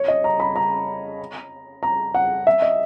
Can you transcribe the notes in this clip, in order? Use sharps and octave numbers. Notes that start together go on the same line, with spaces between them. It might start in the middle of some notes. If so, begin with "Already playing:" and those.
Already playing: C#5
D#5
A#5
B5
A#5
A#5
F#5
E5
D#5